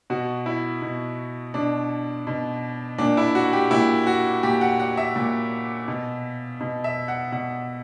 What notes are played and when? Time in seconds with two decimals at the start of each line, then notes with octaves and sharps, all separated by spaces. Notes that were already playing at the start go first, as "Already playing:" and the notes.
0.10 B2 F#4
0.46 E4
0.82 B2
1.54 B2 D4
2.27 B2
2.98 A#2 D4
3.17 E4
3.35 F#4
3.53 G4
3.71 A#2 E4
4.07 F#4
4.43 A#2 G4
4.61 F#5
4.80 F#5
4.97 E5
5.16 A#2
5.88 B2
6.61 B2
6.84 E5
7.08 F#5
7.32 B2 F#5